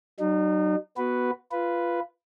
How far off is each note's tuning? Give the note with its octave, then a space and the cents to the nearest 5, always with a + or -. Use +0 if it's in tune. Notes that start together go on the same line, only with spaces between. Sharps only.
F#3 +35 D#4 -35
B3 -5 F#4 +0 B4 +0
F4 -15 B4 +0